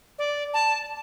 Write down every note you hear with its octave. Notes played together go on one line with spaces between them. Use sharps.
D5
A5